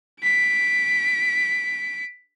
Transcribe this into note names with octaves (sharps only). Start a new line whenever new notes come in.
B6 D7